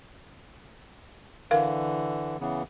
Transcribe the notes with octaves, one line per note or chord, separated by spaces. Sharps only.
D3 E3 A#4 F5
C#3 E3 B3